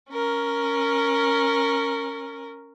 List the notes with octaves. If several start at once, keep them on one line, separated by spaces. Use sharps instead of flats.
C#4 A#4